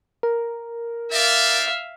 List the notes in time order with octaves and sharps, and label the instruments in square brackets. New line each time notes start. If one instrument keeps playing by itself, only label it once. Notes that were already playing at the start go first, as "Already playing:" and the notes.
[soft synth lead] A#4
[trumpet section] D#4 D5 [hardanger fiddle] E5 F5